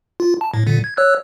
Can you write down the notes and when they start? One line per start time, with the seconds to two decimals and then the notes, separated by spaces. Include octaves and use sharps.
0.20 F4
0.41 A5
0.54 A2
0.67 A#2 D3
0.84 G#6
0.97 C#5 E6 F#6